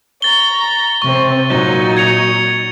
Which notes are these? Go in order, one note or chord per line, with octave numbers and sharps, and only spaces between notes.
A#5 C#6 A6 G7
C3 C4 C#6
A#2 F#3 D#4
G#6 C#7 F7